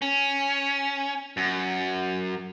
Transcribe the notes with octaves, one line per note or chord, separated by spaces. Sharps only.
C#4
F#2